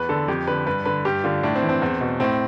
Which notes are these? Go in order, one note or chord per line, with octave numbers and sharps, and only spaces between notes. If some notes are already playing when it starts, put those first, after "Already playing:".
Already playing: E2 B4
D3 A4
F2 G4
D3 B4
G2 B4
D3 B4
G2 G4
D3 F4
A2 D4
C4
E3
C4
E2
B2
A2 C4